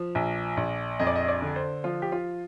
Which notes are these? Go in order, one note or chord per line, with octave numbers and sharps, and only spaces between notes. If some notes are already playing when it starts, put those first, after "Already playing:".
Already playing: F3
A#1
A#1
F2 D#5
D5
D#5
D5
D3
C5
F3 F4
G4
F4